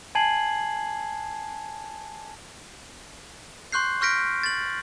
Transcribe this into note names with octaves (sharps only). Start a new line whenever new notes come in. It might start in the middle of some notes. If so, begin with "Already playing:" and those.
G#5 A5 G#6 C7 F#7
C6 C#6 F#6 G6 C7
C#6 F6 G6 A#6 B6 D7
A6 F#7